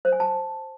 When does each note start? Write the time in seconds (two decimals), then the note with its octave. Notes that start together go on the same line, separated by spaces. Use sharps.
0.05 C5
0.12 G#5
0.20 A5